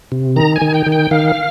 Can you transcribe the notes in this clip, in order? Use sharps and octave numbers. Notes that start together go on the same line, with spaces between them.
C3
D#3 A#5
G#5
D#3
G5
D#3
G5
D#3 F5